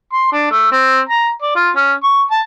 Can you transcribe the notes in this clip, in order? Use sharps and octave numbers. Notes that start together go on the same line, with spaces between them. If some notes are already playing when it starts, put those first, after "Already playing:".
C6
D4
A3
C4
A#5
D5
F4
C#4
C#6
A5